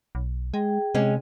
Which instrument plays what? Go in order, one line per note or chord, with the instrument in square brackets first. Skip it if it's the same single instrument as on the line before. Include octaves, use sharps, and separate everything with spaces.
[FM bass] B1
[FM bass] G#3 [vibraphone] G#4 G5
[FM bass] C3 [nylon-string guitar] G#3 C#4